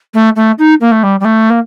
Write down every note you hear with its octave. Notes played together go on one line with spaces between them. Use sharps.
A3
A3
D#4
A#3
A3
G3
G3
A3
A#3